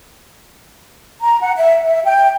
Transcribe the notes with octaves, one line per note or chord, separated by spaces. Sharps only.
A#5
F#5
E5
E5
G5